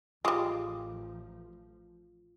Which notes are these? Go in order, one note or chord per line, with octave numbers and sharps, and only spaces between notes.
A1 F3 G3 G#3 F4 D6 D#6